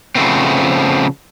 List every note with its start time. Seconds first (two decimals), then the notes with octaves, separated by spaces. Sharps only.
0.15 C#3 F3 A3 B3 C4